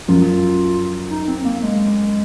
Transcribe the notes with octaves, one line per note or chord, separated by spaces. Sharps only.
F#2 F4
D#4
C4
A#3
G#3